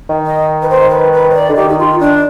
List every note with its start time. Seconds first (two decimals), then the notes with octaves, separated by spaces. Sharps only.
0.10 D#3
0.26 D#5
0.62 B4
0.70 C5
0.91 B4
1.13 B4
1.30 C5
1.34 D5
1.49 D3
1.56 D#3 G4
1.69 D#4
1.79 F4
2.00 D4